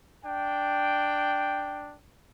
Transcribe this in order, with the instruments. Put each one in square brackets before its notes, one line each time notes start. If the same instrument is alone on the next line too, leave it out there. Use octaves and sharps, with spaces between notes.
[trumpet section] D4 G5